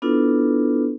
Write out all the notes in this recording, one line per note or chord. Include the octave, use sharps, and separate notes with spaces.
B3 D4 E4 F4 A4 B4